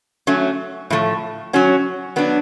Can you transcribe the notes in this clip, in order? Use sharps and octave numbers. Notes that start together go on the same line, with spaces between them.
F#3 A3 C#4
A2 F3 A3
F#3 C#4 F#4
F#3 B3 D4